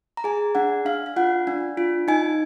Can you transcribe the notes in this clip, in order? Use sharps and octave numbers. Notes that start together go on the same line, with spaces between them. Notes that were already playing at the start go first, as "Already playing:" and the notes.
A#5
G#4 G#5
D4 F#5
D4 F5
F5
F4 F#5
D4
F4
D#4 G#5